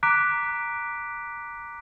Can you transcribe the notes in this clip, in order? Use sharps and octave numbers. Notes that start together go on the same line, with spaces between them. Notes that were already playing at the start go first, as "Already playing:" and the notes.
A#5 D6 F#6 B6 D7